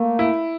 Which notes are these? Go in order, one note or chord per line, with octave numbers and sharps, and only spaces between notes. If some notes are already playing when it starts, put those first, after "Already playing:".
Already playing: A3 A#3
E4